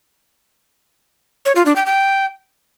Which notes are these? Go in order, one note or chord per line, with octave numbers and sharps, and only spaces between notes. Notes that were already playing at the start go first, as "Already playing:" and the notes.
C#5
F4
D4
G5
G5